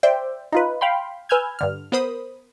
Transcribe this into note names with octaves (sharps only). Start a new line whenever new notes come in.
C5 D5 E5 G5
D#4 F4 B4
F5 G5 B5 C6
B4 G#5 E6 F6 G6 G#6
G2 D3 F6
B3 A#4 C5 B5 D#6